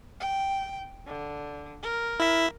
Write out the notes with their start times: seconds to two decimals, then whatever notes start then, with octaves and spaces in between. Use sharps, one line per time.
0.20 G5
1.06 D3
1.83 A#4
2.20 E4 E5